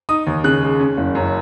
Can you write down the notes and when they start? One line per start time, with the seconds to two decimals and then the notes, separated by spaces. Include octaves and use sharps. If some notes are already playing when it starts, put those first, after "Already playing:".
0.09 D#4 D#6
0.27 D#2
0.44 C#3 F#6
0.62 G#3
0.80 C#4
0.97 F#1
1.15 F#2